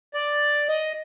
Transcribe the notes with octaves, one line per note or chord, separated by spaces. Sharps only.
D5
D#5